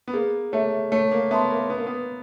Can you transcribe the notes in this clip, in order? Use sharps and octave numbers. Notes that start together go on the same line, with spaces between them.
B3
A#3 G#4
A3 C#5 E5
A3 C#5
A#3
B3 E5 A5 C6
A#3
B3 B4
A#3
B3